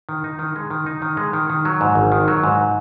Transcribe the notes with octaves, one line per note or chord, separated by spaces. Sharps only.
D#3
D#4
D#3
G#3
D#3
D#4
D#3
G#3
D#3
D#3
F#3
G#2
G#1
D#3
F#3
G#2